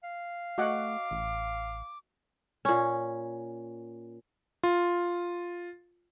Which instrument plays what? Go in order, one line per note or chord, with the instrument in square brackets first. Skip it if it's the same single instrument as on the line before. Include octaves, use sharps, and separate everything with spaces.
[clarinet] F5
[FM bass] A3 [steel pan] F#4 D#5 F#5 [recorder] D6
[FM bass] A1
[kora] A#2 C#4
[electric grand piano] F4